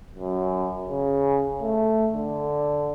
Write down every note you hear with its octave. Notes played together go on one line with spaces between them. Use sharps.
F#2
C#3
A3
D3